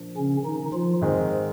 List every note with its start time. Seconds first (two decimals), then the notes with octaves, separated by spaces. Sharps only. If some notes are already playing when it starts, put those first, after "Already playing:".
Already playing: A#2 F3 A#3 D4
0.17 C#3 C#4
0.45 D#3 D#4
0.73 F3 F4
1.01 G#2 D#3 G#3 C4